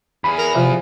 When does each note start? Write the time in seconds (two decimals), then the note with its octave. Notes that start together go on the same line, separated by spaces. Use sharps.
0.24 E2 G#4 B5
0.38 A#4
0.55 C3 F3